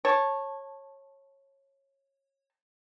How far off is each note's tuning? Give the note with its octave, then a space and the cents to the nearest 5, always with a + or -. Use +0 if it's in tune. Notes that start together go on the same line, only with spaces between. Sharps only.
C#5 -20 A5 +0